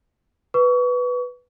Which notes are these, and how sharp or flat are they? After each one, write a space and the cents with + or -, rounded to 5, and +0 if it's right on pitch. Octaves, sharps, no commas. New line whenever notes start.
B4 +0 C#6 +35